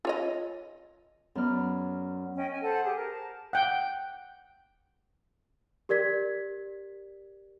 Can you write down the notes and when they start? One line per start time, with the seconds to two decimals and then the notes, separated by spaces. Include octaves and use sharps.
0.05 F4 C#5 D#5
1.35 F#2 F#3 B3 D5 F6
2.36 C#4 D#5 G5
2.50 G#5
2.61 A4 C5 F#5
2.83 G4 G#4
2.96 A#4
3.10 A5
3.53 F#5 G5
5.89 G4 A#4 D5 G#6 B6